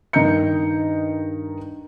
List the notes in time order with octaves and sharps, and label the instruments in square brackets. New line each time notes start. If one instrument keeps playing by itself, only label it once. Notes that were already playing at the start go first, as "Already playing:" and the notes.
[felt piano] G2 D#3 D#5 A#5 G6 C#7